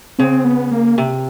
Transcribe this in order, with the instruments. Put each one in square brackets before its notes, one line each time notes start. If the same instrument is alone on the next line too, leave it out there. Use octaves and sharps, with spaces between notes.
[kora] C#3 [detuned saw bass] C4
[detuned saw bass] B3
A#3
[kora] C3